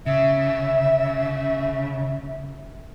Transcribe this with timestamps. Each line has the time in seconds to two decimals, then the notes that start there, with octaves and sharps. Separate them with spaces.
0.06 C#3 E5